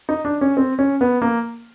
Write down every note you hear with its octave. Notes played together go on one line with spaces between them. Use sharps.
D#4
D4
C#4
C4
C#4
B3
A#3